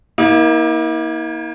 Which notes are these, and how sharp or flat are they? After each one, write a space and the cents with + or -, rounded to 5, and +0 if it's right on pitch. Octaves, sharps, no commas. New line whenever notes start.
A#3 +25 E4 -40